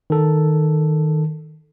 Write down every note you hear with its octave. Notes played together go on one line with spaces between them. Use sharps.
D#3 A4